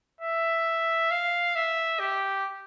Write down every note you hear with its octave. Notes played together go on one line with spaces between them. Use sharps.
E5
F5
E5
G4